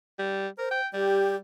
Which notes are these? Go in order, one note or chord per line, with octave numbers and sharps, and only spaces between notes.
G3
A#4 C5
G5
G3 G4